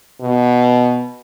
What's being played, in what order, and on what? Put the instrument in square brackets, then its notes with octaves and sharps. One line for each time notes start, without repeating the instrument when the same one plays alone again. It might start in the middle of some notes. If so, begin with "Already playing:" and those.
[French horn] B2